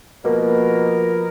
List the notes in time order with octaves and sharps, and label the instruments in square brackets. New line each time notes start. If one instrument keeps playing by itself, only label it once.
[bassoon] B2 [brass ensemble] F3 B3 A#4 [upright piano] A#3